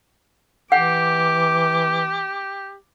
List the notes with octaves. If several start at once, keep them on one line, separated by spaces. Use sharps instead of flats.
E3 G4 F#5 D6